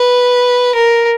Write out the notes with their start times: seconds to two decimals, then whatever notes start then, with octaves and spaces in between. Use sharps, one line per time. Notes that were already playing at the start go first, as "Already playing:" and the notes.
Already playing: B4
0.75 A#4